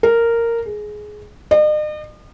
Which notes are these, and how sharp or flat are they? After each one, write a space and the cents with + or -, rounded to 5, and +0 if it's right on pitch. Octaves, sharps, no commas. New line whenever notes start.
A#4 -10
G#4 +15
D#5 -45